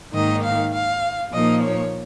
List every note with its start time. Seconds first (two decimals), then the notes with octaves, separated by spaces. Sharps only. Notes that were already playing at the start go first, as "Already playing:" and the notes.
0.13 G#2 D#3 A#3 D#4 D#5
0.43 F5
0.73 F5
1.33 A#2 F3 A#3 D#4 D#5
1.62 C#5